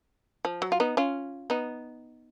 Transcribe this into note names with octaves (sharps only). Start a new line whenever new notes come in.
F3
F#3
F4
B3 D#4
C#4 F4
B3 D#4